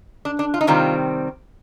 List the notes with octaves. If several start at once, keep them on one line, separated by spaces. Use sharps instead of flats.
D4
D4
F4
D#4
C3 D#3 G3 C4 F4